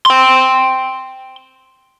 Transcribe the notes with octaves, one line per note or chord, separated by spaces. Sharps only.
G5 C6